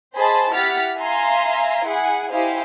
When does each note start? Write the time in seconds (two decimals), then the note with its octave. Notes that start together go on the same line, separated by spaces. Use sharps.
0.15 G#4 C5 D#5 A5 B5 C6
0.53 E4 G4 F#5 F6 A6 B6
0.99 E5 F5 G#5 A#5 C6
1.85 E4 G#4 F#5 G#5
2.30 E4 G4 C5 D#5 F5 G#5